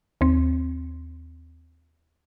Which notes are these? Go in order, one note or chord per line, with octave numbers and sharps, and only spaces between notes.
D#2 C4